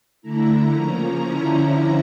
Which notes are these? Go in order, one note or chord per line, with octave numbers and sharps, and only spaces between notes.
D3 A3 E4 A#5
C#3 F3 A#3 C#4
D3 F3 C#4 E4 A#5